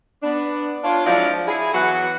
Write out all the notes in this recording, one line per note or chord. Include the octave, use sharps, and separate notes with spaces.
B3 D4
D4 F4 C#5
F3 F#3 G#3 E4 D5 F5
E4 G#4
E3 F#3 B3 F#4 F#5